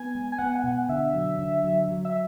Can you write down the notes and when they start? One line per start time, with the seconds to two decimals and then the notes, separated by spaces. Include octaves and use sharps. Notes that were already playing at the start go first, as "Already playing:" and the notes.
Already playing: B3 G#5
0.15 G#3
0.32 G#5
0.39 B3 F#5
0.55 G#5
0.64 B2
0.72 F#5
0.89 D3 E5
1.13 F#3
1.39 D3
1.64 F#3
1.88 F#3
2.05 E5